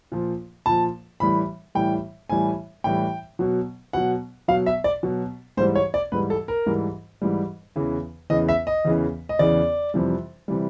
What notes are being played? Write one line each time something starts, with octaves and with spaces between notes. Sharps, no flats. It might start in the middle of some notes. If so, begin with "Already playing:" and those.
A#2 F3
A#2 F3 A5
A2 E3 G3 B5
A2 E3 G3 G5
A2 E3 G3 G#5
A2 E3 G3 G5
B2 F#3
B2 F#3 F#5
B2 F#3 F5
E5
D5
B2 F#3
G#2 E3 G3 C5
C#5
D5
G#2 E3 G3 B4
A4
A#4
G#2 E3 G3
G#2 E3 G3
E2 C#3 E3
E2 C#3 E3 D#5
E5
D#5
E2 C#3 E3
D#5
E2 C#3 E3 D5
F2 C3 E3 G3
C3 E3 G3